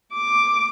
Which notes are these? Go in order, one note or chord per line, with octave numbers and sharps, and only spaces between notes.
D6